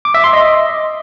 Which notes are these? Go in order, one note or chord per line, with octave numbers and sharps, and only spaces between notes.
D6
E5
C6
D#5